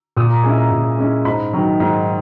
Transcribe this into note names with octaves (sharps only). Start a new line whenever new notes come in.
A#2 D#6
A#5
G#3 C#4 E4 G#5
A#5
A#2
G#3 C#4 E4
G#2 B5
D#3 F#3
G#2